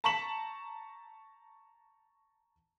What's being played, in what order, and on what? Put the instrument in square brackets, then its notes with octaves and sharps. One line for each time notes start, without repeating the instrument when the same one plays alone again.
[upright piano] A5 A#5 C#6 B6 E7 F#7